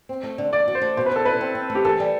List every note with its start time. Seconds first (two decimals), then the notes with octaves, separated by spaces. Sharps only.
0.09 C4
0.23 A3
0.38 D3
0.53 D3 D5
0.68 F#4
0.75 C5
0.81 A3
0.97 B2 C5
1.06 B4
1.11 E4 A4
1.25 E4 B4
1.41 C4
1.55 C4
1.70 A3
1.75 G4
1.85 E3 A4
2.00 G3